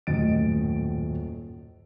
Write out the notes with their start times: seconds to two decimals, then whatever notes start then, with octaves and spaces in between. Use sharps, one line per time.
0.07 D#1 F#2 A2 D#5 A6 D7